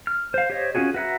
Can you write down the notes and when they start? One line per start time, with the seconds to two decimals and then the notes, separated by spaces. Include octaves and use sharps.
0.07 F6
0.34 C5 F5
0.50 G4 C5 C#5 D#5
0.75 C#4 D4 F4 F#4 G#4
0.94 F#4 B4 E5 F#5 A#5